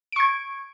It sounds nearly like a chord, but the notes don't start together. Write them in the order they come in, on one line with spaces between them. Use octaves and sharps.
D7 C#6 G#6